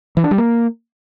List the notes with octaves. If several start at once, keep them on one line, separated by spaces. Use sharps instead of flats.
E3
D4
G3
A#3